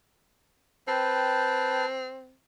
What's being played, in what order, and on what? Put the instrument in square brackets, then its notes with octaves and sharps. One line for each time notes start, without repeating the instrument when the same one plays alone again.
[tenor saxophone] C4 [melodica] B4 G5 A5